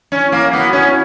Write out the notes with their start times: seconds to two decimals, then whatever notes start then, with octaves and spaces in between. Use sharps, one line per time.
0.12 C#4 E4
0.32 A#3
0.53 B3 F#4
0.73 C#4